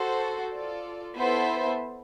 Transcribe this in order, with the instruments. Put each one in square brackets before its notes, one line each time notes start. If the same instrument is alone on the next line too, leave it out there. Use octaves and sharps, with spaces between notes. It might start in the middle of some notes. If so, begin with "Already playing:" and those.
Already playing: [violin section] F#4 A4 C5
F4 A4 D5
B3 E4 A4 C5 E5